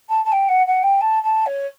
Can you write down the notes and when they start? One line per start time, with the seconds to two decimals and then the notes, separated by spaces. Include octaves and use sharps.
0.08 A5
0.24 A5
0.31 G5
0.48 F#5
0.66 F#5
0.82 G5
1.00 A5
1.22 A5
1.46 C#5